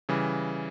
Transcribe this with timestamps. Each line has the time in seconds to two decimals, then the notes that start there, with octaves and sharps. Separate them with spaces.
0.09 C#3 E3 G3